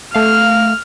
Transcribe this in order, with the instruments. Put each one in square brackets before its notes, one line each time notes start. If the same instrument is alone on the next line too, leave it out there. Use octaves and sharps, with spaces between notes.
[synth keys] A3 F5 [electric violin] F6